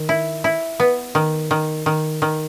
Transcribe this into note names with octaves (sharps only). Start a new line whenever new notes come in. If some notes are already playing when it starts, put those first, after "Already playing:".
Already playing: D#3
E4
E4
B3
D#3
D#3
D#3
D#3